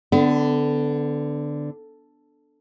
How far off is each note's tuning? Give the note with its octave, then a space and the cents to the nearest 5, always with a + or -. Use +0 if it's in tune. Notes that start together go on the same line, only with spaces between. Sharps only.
D3 +0 B3 +30 D4 +0